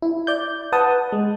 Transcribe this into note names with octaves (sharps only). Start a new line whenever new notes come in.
E4
D5 G6
B4 F#5 A5 D#6
G#3